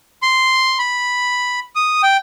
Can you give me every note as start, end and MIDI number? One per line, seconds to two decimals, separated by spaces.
0.22 0.78 84
0.79 1.60 83
1.75 2.02 87
2.03 2.17 79